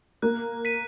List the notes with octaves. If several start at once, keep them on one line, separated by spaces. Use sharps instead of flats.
A#3 F#6
B6 D#7